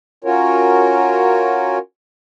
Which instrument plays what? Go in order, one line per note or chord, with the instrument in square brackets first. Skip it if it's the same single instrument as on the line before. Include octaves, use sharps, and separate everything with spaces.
[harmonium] C#4 F4 F#4 A#4 C#5